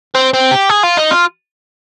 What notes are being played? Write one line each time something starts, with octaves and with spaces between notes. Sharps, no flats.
C4
C4
G4
G#4
F4
D#4
F4